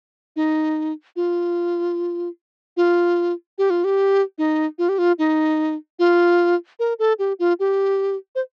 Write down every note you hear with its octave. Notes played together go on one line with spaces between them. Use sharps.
D#4
F4
F4
G4
F4
G4
D#4
F4
G4
F4
D#4
F4
A#4
A4
G4
F4
G4
C5